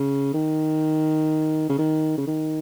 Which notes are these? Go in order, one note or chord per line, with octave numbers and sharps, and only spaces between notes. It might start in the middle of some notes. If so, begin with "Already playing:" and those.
Already playing: C#3
D#3
C#3
D#3
C#3
D#3